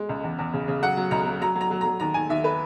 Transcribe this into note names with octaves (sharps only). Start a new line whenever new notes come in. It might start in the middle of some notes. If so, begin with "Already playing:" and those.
Already playing: G#3
C#2
E2
E2
C#3
C#3
F#3 F#5
F#3
C#2 A#5
F#3
F#3 A#5
F#3
A#5
F#3
F#3 A#5
D#2 A#5
D#2 G#5
D#2 E5
B4